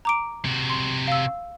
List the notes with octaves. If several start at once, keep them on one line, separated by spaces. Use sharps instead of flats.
A#5 D6 D7
C3 F#4
C6
F5 E6